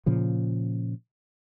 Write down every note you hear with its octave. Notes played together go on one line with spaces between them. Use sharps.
A#2 C#3 F3